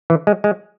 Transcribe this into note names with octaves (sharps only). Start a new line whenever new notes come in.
E3
G#3
G#3